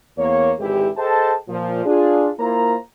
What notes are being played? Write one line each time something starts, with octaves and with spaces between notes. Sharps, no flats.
E2 A#3 B3 C#5
G#1 D3 E3 G#3 E4 G4
G#4 A4 C5 D#5 G5 A5
A#2 F3
D4 F4 G#4
A#3 E4 F4 A#4 C5 A#5